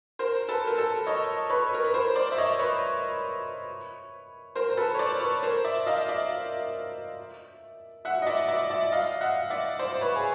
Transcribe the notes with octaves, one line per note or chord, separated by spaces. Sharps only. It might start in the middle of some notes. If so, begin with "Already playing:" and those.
A#4 C5
A4 B4
A#4
A4
C#5 D#5
B4 C#5
A#4
B4
A#4 C5
C5 D5
E5
C#5 D#5
B4 C#5
A#4 C5
A#4
A4 B4
C#5
C5 D5
B4 C#5
A#4 C5
D5 E5
D#5 F5
D5 E5
E5 F#5
D#5
D5 E5
D5 E5
D5 E5
D#5 F5
E5 F#5
D5 E5
C5 D5
B4 C#5
G#4